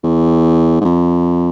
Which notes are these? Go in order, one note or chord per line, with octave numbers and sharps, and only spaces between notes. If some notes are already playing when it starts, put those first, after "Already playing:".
E2
G#2
F2